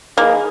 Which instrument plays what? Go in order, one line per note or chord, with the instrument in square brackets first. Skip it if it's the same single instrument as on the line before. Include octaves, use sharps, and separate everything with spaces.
[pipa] A#3 [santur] D#4 G#4 B4 F5